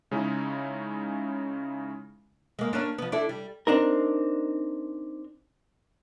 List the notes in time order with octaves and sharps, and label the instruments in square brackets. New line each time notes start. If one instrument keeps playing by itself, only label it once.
[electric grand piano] C#3 G#3 C#4 D#4 E4
[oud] G#3 A#3
A#3 C#4 D4
F3 B3
D4 E4 A4
G3
[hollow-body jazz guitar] C4 D4 D#4 A#4